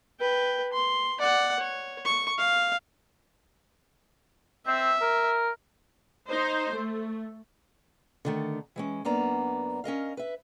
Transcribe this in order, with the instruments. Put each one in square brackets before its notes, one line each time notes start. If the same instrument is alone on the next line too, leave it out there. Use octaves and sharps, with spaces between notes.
[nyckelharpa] B4 G5
C6
D5 F#5
C#5
C#6
F5
[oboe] C4 [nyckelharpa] E5
[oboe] A#4
[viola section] D#4 C5
A3
[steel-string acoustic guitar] D3 D#3 A3
E3 G#3 C#4
F#2 A#3 B3 D4 A#5
C#4 A#4 D#5 F5
B4 E5